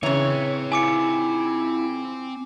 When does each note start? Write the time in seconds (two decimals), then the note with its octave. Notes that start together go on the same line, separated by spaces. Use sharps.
0.03 C#3 E3 C4 C#5 A#5
0.72 E4 F4 G#5 D6 C#7